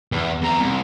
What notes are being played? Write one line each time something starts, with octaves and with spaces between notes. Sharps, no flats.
E2
E2 A#5
C2